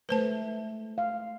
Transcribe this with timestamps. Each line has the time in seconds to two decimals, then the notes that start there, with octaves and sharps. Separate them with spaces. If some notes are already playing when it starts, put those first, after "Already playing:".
0.09 G#3 A3 B4 C5 A5
0.98 F5